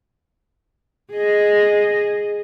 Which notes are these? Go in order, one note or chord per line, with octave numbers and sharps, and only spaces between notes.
G#4 D#5